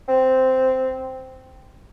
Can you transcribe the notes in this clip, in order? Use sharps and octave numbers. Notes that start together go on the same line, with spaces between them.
C4